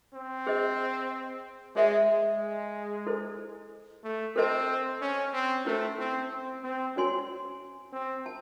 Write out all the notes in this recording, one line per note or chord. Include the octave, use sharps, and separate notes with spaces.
C4
G#4 C5 D#5
G#3 G#4 C#5 E5
G#3
E4 A4 C5
A3
C4 A4 C5 D#5 A5
C#4
C4
A3 C#4 E4 C5
C4
C4
C4
C#4 F#4 C#5 G#5 C6
C4
A5